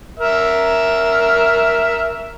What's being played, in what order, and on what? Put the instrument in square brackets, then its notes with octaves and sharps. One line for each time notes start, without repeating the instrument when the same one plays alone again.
[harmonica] A#4 E5